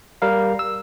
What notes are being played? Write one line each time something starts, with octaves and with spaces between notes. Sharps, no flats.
G3 A#4 F5
E6